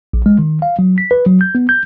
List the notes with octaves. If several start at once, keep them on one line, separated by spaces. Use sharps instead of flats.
A#1
G#3
D#3
F5
F#3
B6
B4
F#3
G6
B3
G6